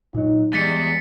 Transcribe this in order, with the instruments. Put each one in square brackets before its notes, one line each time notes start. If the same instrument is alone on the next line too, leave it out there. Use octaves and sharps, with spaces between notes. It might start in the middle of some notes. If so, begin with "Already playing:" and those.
[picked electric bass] A#2 F#3 [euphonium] D#4
[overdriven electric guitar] E2 [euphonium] G3 [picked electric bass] G#3 [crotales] A6 B6 C#7